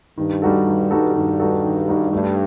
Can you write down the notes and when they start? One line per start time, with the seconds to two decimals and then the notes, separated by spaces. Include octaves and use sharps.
0.18 G2 D#3
0.42 G3 D#4 F#4 A4
0.67 D#3
0.91 G3 D#4 F#4 A4
1.15 G2 D#3
1.40 G3 D#4 F#4 A4
1.64 D#3
1.88 G3 D#4 F#4 A4
2.12 G2 A3